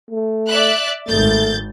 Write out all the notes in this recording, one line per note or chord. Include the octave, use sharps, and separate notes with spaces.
A3
D5 E5 F#6
G#1 A3 G6 A6